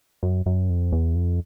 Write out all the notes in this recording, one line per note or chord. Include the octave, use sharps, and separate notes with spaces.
F#2
F#2
F2
E2
F2